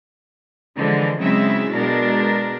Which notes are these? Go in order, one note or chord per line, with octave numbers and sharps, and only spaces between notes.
D3 E3 F3 G#3
C#3 F#3 G#3 C4 E4 E5
B2 G#3 D4 A#4